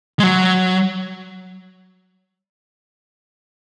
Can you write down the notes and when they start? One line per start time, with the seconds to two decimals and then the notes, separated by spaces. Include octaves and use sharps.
0.19 G#3
0.23 F#3